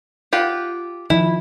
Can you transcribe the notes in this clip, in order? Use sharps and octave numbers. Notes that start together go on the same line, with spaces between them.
F4 G4 F#5
D#3 F3 E4